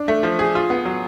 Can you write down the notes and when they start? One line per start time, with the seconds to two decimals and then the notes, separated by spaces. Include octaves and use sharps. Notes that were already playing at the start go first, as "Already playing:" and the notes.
Already playing: D4
0.08 A3
0.23 F3
0.39 G#4
0.55 F4
0.70 B3
0.85 F#3